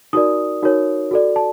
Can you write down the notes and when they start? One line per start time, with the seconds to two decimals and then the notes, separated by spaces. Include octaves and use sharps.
0.13 D#4 F#4 A#4 D5 D#6
0.63 D#4 F#4 A#4 C#5
1.11 F#4 A4 D5
1.36 A5